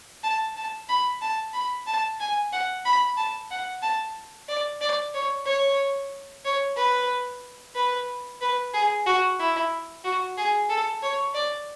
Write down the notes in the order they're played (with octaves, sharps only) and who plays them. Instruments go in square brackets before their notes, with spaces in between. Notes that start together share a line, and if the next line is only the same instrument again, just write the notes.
[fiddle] A5
A5
B5
A5
B5
A5
G#5
F#5
B5
A5
F#5
A5
D5
D5
C#5
C#5
C#5
B4
B4
B4
G#4
F#4
E4
F#4
G#4
A4
C#5
D5